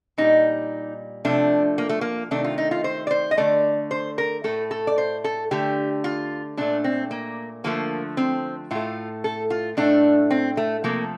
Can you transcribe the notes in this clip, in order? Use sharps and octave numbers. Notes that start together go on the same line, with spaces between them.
A#2 G3 D#4
C3 F3 A3 D4
A#3
A3
A#3
C3 D#3 A3 D4
F4
D#4
F4
C5
D5
C5
D#5
D3 A3 D5
C5
A#4
A2 A3 A4
A4
D5
C5
A4
D3 A3 G4
F4
A#2 A3 D4
C4
A#3
D3 F3 A3 A#3
C4
A2 A3 F4
A4
F4
A2 A3 D4
C4
A3
C3 F3 A3 A#3